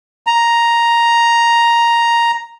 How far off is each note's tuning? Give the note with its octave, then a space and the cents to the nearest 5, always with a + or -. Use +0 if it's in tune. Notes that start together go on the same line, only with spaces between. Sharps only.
A#5 +5